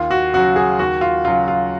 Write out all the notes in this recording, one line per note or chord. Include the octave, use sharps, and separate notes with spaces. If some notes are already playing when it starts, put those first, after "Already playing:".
Already playing: D#2 F4
F#4
C#3 F#3 F#4
G#4
D#2 F#4
F4
C#3 F#3 F4
F4